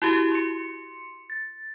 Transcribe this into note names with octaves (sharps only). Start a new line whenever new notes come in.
E4 F#4 G4
C6 C#7
A6